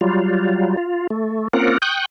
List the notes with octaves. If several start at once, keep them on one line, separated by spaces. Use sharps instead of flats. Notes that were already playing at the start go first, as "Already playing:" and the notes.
F#3 G3 F4
F4
A3
A#3 C4 C#4 F4 A#4 F#5
G5 C#6 D#6 F#6 G6